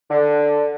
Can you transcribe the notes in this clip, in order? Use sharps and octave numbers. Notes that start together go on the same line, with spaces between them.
D3